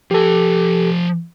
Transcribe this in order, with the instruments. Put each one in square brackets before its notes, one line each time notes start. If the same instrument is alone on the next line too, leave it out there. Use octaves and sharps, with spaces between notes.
[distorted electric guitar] F3 G#5 [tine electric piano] G4 A4